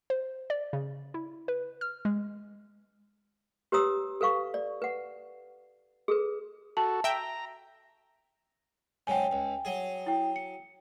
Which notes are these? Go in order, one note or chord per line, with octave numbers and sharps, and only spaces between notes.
C5
D5
C#3
E4
B4
F6
G#3
G4 B4 C#5 A#5 D#6 E6
A4 B4 F5 C#6
D5
B4 F#5
G#4 A4 B4
F#4 A4 A5
E5 G5 A#5
G#2 C#3 F#3 G5 G#5
C#2
F#3 G#4
E4 G5
C#7